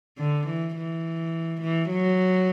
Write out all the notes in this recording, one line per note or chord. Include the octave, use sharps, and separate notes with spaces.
D3
E3
E3
E3
F#3